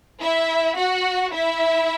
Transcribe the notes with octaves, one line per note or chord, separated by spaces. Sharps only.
E4 E5
F#4 F#5
E4 E5